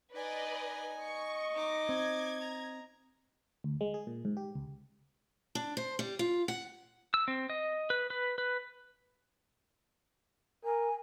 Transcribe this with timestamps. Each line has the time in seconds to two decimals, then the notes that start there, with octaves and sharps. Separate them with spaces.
0.13 D#4 B4 D5 D#5 G#5
1.01 D#5 C#6
1.55 D#4 D6
1.89 C4 G#6
2.41 A#5
3.64 D2
3.81 G#3
3.94 G#4
4.07 A#2
4.25 G#2
4.37 G4
4.55 C#2
5.55 D4
5.77 C5
5.99 G3
6.19 F4
6.48 F#5
7.14 E6
7.28 C4
7.50 D#5
7.90 B4
8.10 B4
8.38 B4
10.65 A#4 G#5